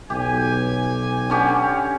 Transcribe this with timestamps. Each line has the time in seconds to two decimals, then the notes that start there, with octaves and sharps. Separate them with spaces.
0.10 B1 G4 G#5
1.30 D3 C#4 G4